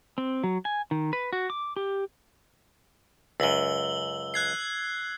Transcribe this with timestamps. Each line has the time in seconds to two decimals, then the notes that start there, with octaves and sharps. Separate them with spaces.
0.18 C4
0.44 F#3
0.65 G#5
0.91 D#3
1.13 B4
1.33 F#4
1.50 D6
1.76 G4
3.40 C#2 F#2 E6 F#7 G7
4.34 F#6 G#6 C7